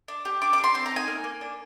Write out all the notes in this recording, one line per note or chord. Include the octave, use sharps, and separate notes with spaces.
D4
G4
D4 D6
D6
D4
C6
C4 C6
A#5
D#4
G#5
A#3
A#3
D4